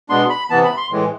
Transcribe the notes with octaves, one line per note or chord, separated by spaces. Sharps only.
B2 G#3 B3 D4 C6
B5
C3 E3 B3 A5
B5
C6
A2 E3 G#3